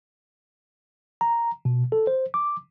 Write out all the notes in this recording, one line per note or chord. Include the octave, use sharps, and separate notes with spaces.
A#5
B2
A4
C5
D6